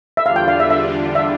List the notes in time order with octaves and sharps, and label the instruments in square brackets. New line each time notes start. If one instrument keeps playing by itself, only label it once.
[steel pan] E5
[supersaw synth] E2 D3 G3 D4 F4 [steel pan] F5
[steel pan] G5
F5
E5
E5
E5